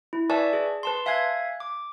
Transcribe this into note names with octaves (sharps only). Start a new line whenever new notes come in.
E4
B4 D5 E5 G#5 A5 C#6
G#4
B4 A5 C6
E5 F5 G#5 F#6 G#6
D6